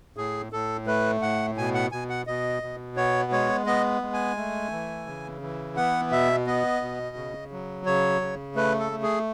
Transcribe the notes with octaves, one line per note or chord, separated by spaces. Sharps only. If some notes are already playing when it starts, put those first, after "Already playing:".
A2 G#4
A2 A4
A3 B4
A2 F#5
B2 G#5
F#5
B2 G#5
F#5
B2 D#5
B2
B3 C#5
G#3 C#5
B3 D#5
G#3
G#5
A3
E3
C#3
E3
B3 F#5
B2 E5
B3 D#5
B2
C#3
F#3
C#3 C#5
C#3
A3 B4
A4
A3
G#4